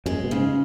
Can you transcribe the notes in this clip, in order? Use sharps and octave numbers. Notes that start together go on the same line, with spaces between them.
F#2 G#3
B2
G#2 C#3